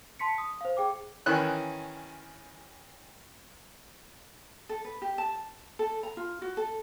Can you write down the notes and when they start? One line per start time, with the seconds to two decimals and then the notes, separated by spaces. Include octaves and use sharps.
0.19 A5 C6 B6 C#7
0.38 D#6
0.61 C5 F5
0.77 G#4 G5 D6
1.26 D#3 E3 C#4 F#6
4.69 A4
4.85 B4
5.02 G4
5.18 A5
5.79 A4
6.03 A#5
6.17 F4
6.42 F#4
6.57 A4